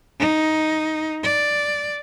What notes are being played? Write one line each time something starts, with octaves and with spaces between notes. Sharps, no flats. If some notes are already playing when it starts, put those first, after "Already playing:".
D#4
D5